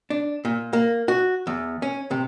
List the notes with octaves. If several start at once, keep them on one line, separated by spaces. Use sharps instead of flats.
D4
A#2
A#3
F#4
E2
C#4
C3